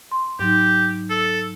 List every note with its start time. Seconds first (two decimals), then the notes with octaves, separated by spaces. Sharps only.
0.11 C6
0.39 G#2 F#3 D#4 G4
1.10 A4